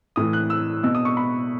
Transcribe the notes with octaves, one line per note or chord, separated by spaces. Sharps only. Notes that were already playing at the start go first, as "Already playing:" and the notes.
A2 E3 D#6
F#6
E6
B2 E6
D#6
C#6
B5